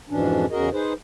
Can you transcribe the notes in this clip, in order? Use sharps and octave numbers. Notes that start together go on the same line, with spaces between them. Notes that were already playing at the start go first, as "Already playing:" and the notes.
F2 G#2 B2 E3 C#4 D4
E2 C#3 F#4 G#4 A#4 D#5
D#4 G#4 B4 C5